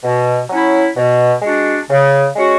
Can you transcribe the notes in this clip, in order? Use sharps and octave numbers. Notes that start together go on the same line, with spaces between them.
B2
F#3 C#4 E4
B2
G#3 D4 F#4
C#3
G#3 C#4 F#4